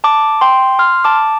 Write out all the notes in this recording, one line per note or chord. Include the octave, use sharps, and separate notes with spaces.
A5 D6
G5 C6
C6 F6
A5 D6